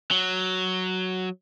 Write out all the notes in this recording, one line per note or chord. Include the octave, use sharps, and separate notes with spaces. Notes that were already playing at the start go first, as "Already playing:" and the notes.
F#3